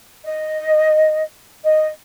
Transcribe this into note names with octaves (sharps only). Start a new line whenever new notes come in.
D#5
D#5